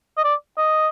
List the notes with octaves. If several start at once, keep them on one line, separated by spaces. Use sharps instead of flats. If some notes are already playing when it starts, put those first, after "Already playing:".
D#5
D5
D#5